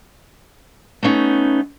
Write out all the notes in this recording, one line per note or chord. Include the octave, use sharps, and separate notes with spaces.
A3 B3 C#4 D#4